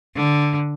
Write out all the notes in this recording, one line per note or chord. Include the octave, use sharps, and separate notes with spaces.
D3